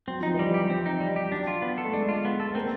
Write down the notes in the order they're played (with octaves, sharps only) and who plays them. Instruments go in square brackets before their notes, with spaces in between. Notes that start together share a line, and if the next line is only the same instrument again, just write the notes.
[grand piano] F#3 [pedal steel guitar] C4
[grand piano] F3 [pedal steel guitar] D#4
[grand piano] E3 [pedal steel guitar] G3
[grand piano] F3
[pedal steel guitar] G4
C4
D#4
G3
G4
[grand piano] F#3 [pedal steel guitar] D4
[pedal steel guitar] F4
B3
A4
[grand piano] A3
[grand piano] G#3 [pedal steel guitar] D4
[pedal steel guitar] F4
B3
A4
[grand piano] A3
[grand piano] A#3 [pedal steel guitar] C4